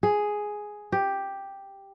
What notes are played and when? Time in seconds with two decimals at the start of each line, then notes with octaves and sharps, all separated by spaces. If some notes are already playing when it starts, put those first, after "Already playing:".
0.03 G#4
0.92 G4